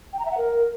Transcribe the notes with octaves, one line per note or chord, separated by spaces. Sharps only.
G5
A#5
E5
F#5
A#4